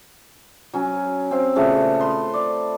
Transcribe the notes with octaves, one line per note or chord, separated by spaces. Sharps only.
F#3 C#4
C4 F5
A#2 C#3 A3 B3
B4 C6
D5